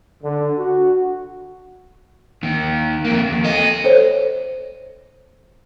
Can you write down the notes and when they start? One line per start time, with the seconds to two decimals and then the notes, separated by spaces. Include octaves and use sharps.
0.23 D3
0.57 F#4
2.43 D#2 D#3
3.05 F2 A#3
3.29 D#2
3.44 A4 D#5
3.84 A4 C5 C#5